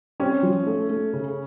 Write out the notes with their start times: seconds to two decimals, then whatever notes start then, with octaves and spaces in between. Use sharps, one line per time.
0.20 C4 C#4
0.43 F3
0.66 A3
0.90 A3
1.13 C#3